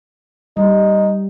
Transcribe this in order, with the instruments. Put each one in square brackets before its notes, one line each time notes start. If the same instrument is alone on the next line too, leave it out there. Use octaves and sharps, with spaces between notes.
[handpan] G3 [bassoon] D#4